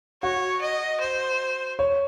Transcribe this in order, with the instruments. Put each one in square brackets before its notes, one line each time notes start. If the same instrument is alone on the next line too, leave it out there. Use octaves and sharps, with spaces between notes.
[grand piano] F#4 [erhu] C#5
[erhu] D#5
C5
[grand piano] C#5